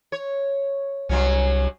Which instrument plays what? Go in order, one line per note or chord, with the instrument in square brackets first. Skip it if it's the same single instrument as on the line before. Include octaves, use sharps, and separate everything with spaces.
[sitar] C#5
[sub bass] C2 [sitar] G2 F#3 C#4